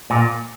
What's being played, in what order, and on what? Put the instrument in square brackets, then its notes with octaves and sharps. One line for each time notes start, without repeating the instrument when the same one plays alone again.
[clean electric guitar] A#2